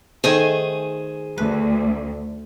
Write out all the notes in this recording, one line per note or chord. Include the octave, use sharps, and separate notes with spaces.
D#3 A3 G#4 C5 G#5
D2 B4